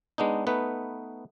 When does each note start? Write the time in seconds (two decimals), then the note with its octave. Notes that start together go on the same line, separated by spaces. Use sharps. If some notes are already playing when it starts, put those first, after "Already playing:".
0.18 G#3 B3 D4 D#4
0.47 A3 B3 D#4 B4